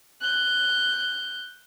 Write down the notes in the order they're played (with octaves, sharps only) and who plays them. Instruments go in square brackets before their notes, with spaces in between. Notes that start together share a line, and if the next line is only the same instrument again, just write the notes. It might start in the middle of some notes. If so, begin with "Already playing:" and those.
[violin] F#6 G6